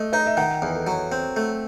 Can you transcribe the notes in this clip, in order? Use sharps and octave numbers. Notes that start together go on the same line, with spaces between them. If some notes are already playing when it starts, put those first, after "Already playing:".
Already playing: A3 D#5
D#4 D#5
E5
D#3 F#5
G5
E2 B4
A4
F#3 B4
C4
A3